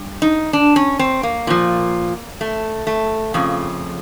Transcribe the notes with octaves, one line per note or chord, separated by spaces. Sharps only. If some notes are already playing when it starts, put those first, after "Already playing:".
Already playing: G2
D#4
D4
C#4
C4
A#3
A#2 F3
A3
A3
F2 C#3 F3